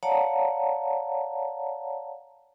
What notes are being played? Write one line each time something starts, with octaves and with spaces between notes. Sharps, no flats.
C#5 D5 F5 F#5 A5 A#5